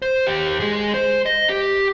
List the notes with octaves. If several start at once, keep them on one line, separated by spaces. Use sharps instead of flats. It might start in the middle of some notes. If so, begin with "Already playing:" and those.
C5
D#2 G4
G#3 G#4
C5
D#5
G4